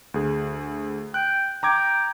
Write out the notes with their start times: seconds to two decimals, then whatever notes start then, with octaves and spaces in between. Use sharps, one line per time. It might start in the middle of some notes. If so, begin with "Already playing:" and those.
0.14 D2 G#4
1.14 G5 F#6
1.63 G5 A#5 D6 G#6